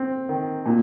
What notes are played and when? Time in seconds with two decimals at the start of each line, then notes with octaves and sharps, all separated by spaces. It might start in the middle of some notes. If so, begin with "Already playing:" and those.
Already playing: C4
0.29 D#3
0.66 A#2